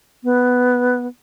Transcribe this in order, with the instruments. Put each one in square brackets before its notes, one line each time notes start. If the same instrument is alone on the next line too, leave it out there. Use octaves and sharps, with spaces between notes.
[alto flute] B3